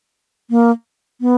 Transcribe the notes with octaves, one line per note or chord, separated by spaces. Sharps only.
A#3
B3